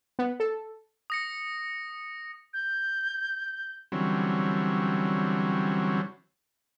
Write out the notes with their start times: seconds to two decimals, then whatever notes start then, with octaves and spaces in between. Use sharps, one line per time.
0.19 B3
0.40 A4
1.10 D#6 A#6 C#7
2.54 G6
3.92 D3 E3 F#3 G3 C4 C#4